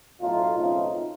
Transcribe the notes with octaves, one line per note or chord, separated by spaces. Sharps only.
B1 A2 F#3 D#4 F4
C#2 B2 F#3 A3 C4 D#4 F4